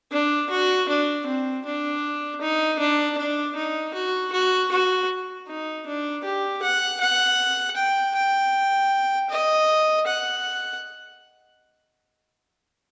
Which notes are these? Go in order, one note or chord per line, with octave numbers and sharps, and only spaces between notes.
D4
F#4
D4
C4
D4
D#4
D4
D4
D#4
F#4
F#4
F#4
D#4
D4
G4
F#5
F#5
G5
G5
D#5
F#5